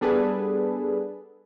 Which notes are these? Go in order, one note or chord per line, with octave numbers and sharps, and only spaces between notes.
G3 B3 D4 G#4 A4 B4